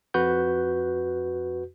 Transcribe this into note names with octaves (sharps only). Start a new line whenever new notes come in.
F2 F#4 B4 G6